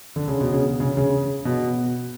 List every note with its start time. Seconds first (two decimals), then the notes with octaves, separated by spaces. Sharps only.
0.16 D3
0.28 C#3
0.41 B2
0.52 C#3
0.80 C#3
0.97 C#3
1.45 B2